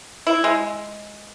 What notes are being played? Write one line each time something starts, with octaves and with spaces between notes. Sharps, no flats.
E4
G#3